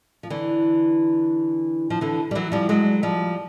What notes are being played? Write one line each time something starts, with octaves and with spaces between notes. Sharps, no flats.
F3
D3 E3
F3
D3 E3
G3
E3 F#3
F3 G3
F#3 G#3
F3 G3